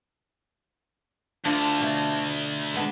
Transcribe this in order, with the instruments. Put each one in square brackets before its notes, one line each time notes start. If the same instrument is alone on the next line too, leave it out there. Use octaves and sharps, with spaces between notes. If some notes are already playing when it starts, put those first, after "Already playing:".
[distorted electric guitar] D2 [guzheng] D4 F4
[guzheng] B2 A3
G#3 B3 D4